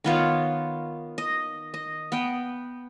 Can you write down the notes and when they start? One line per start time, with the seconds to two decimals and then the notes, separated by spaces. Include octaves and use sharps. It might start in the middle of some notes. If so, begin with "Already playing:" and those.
0.04 D#3 B3 F4 C#5
1.18 D#5
1.74 D#5
2.12 B3 G5